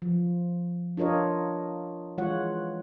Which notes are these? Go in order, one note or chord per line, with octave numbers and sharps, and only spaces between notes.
F3
D4 F4 A#4 C#5 D#5
E3 G#3 F4 C#5 F#5